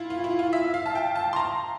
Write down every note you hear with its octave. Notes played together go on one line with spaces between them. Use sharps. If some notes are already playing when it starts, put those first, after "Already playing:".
Already playing: E4 F4
F4
E4
F4
E5
F5
A5
G5
A5
C6
A#5